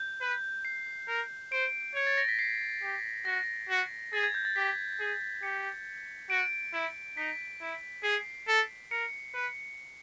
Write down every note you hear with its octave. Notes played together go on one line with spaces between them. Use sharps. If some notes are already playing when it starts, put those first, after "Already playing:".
Already playing: G6
B4
C7
A#4
C5 D7
C#5 G#6
A6
A#6
B6
C7
G4
F#4 A#6
F#4
G#4 A6
G#6
G6
A6
G4 B6
G#4
G4 C#7
F#4 D7
E4
D#4 B6
E4
G#4 C7
A4
A#4 C#7
B4